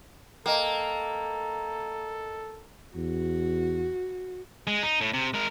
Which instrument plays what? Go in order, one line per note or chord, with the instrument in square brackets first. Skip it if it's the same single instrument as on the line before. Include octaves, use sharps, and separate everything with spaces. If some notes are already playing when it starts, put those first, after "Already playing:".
[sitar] A#3 [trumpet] A4 [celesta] D#5 G5
[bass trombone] E2 [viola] F#4
[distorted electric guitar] G#3
D#4
A2
C3
G#3 A#4